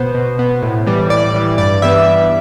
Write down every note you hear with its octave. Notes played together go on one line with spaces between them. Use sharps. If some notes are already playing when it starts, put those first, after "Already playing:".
Already playing: B2 B3 C5
B2
B3
A2
E3 G3
A2 D5
E3 G3
G2 D5
E3 G3 B3 E5
G2